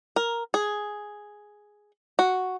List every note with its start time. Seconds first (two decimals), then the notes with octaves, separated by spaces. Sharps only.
0.16 A#4
0.54 G#4
2.19 F#4